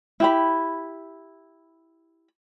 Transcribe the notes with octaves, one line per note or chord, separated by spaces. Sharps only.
E4 G4 B5